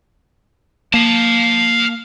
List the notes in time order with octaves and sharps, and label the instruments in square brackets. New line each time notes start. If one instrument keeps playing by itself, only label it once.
[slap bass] A#3 [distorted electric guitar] F5 A5